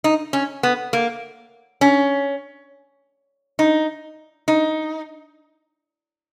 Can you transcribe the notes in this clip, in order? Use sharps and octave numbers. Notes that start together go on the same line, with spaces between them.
D#4
C#4
B3
A#3
C#4
D#4
D#4